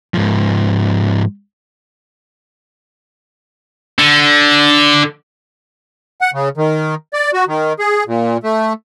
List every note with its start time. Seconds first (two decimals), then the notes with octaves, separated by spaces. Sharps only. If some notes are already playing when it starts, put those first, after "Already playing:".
0.14 G#2 F3
3.99 D3
6.21 F#5
6.34 C#3
6.57 D#3
7.13 D5
7.34 F#4
7.48 D#3
7.79 G#4
8.07 A#2
8.44 A3